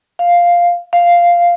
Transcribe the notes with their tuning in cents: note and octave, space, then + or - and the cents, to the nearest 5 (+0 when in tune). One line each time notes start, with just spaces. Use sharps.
F5 +0
F5 -5